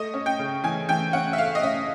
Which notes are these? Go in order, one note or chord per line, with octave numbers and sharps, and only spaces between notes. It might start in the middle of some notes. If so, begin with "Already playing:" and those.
Already playing: A3 D#5
C#4
G5
C#3
E3 G#5
E3 G5
C#4 F#5
E5
A3 F5
D#5
C#4 E5